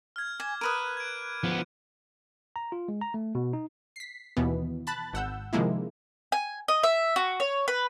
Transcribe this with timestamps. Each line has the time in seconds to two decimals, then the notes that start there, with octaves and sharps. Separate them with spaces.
0.16 F6 G#6
0.40 G#5 D6
0.61 A#4 B4 D#6 F#6 D#7
0.97 G#6 D7
1.44 F3 B3
2.56 A#5
2.72 F4
2.88 G#3
3.01 A#5
3.14 A3
3.35 B2
3.53 D#4
3.96 B6 C7
4.37 D#2 B2 E3 B3
4.87 A5 B5 F#6 A6
5.13 G#1 F#5 E6 G6
5.53 C3 D#3 F3 G#3 A#3 E4
6.32 G#5
6.68 D#5
6.83 E5
7.16 F#4
7.40 C#5
7.68 B4